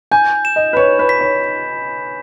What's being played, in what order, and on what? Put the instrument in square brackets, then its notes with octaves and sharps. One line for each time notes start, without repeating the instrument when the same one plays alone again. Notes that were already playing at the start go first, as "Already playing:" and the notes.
[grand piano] G#5 [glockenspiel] G6
[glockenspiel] E7
[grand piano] D#5
B4
[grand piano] C#5 [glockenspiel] B5
[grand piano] B4
[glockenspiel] B6
[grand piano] C#5